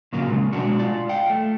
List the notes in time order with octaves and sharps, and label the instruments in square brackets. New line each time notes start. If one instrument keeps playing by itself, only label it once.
[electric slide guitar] A#2 C#3 F#3 A#3 F4
C#3 G#3
B2 G#3 D4 F#4
F4 D5
F5 G5
A3